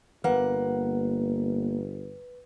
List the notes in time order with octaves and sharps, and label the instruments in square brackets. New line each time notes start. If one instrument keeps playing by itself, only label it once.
[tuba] G1 [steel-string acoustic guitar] A#3 F#5 [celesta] B4